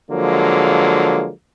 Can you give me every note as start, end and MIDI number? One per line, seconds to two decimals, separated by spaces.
0.11 1.30 50
0.11 1.30 53
0.11 1.30 54
0.11 1.30 56
0.11 1.30 58